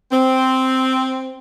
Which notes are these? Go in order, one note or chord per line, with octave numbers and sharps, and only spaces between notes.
C4